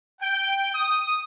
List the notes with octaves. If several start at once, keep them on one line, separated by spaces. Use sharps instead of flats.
G5
D#6